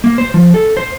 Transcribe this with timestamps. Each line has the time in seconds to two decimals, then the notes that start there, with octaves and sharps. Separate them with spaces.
0.04 A#3
0.18 C5
0.34 F3
0.54 A4
0.77 C5